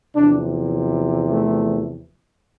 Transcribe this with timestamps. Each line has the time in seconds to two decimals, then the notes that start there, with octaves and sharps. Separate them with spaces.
0.15 E2 C3 F3 D4
1.31 A3